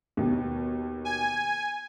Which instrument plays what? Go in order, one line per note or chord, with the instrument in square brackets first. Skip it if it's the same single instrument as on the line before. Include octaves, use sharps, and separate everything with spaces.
[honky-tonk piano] D#2 B2
[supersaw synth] G#5